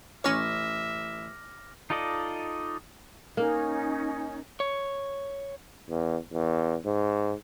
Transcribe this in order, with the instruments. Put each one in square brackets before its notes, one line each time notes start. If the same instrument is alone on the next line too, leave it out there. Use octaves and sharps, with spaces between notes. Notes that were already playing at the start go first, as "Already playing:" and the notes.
[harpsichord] A1 [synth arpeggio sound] C#4 C#5 [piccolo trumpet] E5 [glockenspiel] D6 F6 A#6
[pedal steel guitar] D#4 F4 A4 D5 D#5
[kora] A#3 [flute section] C#4 D#4
[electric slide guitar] C#5
[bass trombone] E2
E2
G#2